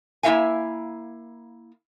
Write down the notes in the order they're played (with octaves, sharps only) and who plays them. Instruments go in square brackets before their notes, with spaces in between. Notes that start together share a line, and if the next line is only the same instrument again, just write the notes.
[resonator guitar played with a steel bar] A#3 E4 F#4 E5 F5 G#5